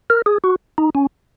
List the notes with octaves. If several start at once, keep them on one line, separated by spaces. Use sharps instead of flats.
A#4
G#4
F#4
D#4
C#4